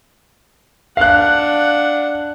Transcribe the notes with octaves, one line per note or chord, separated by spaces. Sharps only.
D4 F5 F#5 F#6